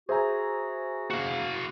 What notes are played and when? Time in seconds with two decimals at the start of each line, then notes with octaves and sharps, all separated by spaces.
0.09 F#4 G#4 C5 E5 G#5 A#5
1.11 A#3 F#4 F5